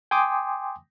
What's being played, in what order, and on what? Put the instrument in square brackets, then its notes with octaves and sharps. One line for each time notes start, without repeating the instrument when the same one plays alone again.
[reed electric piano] G5 G#5 C6 D6 D#6